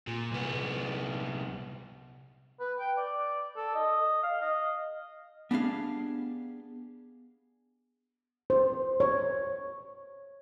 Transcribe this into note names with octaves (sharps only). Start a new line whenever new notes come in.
A#2
C2 B3
B4
G5
D5
A4
D#5
F5
D#5
B3 D4 G4 G#4 F5
C5
C#5